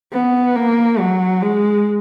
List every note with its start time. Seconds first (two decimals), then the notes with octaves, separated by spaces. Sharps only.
0.13 B3
0.56 A#3
1.00 F#3
1.43 G#3